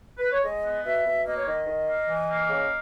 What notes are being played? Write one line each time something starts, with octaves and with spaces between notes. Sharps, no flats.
B4
C#5
G#3 D#5
B3
B2 E5
B2
A#3 D#5
C#5
D#3 D#5
D#3
A#3
E3
A#3
C#3